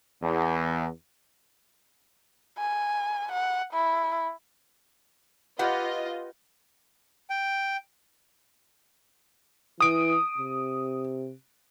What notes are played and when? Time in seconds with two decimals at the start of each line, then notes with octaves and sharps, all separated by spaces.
0.23 E2
2.58 G#5
3.32 F#5
3.73 E4
5.59 F4 G4 B4 D#5 F#5
7.30 G5
9.80 E3 D#6 D7
10.38 C3